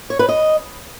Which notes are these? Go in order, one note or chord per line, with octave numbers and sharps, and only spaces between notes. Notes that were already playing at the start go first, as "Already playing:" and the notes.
C#5
B4
D#5